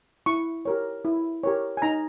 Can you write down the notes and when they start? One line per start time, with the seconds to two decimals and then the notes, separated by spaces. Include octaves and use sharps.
0.26 E4 C#6
0.65 G4 A#4 C#5
1.05 E4
1.44 G4 A#4 C#5
1.77 G#5
1.82 D#4 A#5